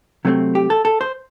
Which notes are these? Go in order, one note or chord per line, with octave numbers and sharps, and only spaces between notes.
C3 F#3 A3 C4
G4
A4
A4
C5